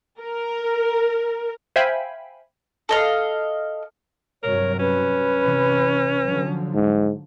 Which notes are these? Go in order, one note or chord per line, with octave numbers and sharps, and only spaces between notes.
A#4
C5 E5 F5 G5 G#5 B5
A4 D#5 F5
G2 C3 F#3 A#4 C#5
C#4 B4
C3 E3
D3 F3 F#3
G#2